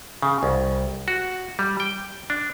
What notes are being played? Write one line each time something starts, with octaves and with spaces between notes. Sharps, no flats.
C#3
C2
F#4
G3
G5
D4